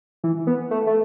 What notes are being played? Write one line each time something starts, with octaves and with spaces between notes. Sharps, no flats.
E3
B3
A3
A3